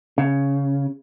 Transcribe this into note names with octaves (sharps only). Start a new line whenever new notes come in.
C#3